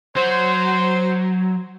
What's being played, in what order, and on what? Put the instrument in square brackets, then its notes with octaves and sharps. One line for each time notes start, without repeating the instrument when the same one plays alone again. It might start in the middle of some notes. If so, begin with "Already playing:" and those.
[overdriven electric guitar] F#3 [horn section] C5